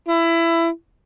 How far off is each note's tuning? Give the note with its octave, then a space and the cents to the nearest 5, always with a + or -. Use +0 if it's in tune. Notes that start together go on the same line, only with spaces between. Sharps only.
E4 +20